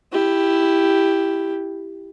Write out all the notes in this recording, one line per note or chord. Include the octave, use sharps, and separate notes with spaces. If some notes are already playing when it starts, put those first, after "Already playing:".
E4 G4